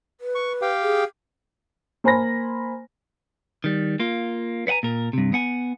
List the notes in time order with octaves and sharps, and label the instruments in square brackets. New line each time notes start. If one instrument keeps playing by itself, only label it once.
[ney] B4
[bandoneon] C#6
G4 F5 G5
[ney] G#4
[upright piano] A#3 C5 G#5 B5 A#6
[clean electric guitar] D#3 G3
A#3 F4
B4 C#5 F#5 G#5 A#5
A#2 A#4
G2 C3
B3 F#5 G#5